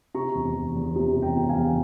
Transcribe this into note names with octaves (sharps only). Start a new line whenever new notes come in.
C3 A#5 C#6
E1
E1
E2
C3
E1
G5 A#5
E1
F5 G#5
E2